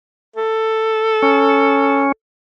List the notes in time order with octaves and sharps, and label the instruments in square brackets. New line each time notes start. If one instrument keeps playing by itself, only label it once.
[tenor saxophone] A4
[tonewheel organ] C#4